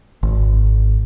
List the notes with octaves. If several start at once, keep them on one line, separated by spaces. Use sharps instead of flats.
G#1